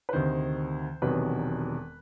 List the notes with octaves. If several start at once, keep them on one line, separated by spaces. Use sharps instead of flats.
B4
D2 C3 D#3 C5
E1 E2 C3 D#3 F#3 B4